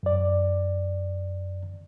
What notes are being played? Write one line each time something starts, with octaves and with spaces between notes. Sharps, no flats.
F#2 D5